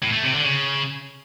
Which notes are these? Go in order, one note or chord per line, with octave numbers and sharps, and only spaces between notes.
A2
A3
C3
D3
C#3